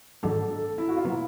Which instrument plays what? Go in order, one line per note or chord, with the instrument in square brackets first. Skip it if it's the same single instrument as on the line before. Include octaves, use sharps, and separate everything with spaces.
[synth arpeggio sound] G#2 D#3 F#3 A3 D4 [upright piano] A4
[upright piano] A4
E4
F#4
F4
[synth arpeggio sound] B2 F#3 A#3 [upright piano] E4